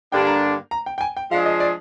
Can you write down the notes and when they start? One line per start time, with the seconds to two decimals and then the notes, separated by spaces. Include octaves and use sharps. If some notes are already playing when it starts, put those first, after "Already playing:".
0.12 G2 D3 G3 A#3 D4 G5
0.27 A#5
0.71 A#5
0.86 G5
0.98 G5
1.01 G#5
1.17 G5
1.31 F3 G#3 D4 G#4 F5
1.46 D#5
1.60 D5